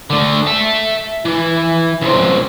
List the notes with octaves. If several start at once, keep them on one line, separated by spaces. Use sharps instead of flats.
D3 A3
E5 A5
E3
C#2 C4